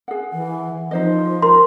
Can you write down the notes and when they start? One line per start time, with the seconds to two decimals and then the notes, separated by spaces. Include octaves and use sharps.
0.08 G#4 F#5
0.33 E3
0.91 F3 D#4 C5 D#5
1.42 A#4 C6